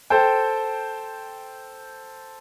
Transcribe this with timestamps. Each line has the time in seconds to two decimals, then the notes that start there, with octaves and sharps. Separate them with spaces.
0.10 A4 C5 G5